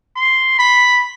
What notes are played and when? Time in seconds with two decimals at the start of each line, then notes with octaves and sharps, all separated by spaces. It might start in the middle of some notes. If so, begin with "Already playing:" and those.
0.16 C6
0.59 B5